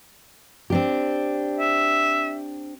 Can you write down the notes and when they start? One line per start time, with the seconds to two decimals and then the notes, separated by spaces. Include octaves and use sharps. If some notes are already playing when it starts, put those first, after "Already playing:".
0.70 C4 D4 G4
1.60 E5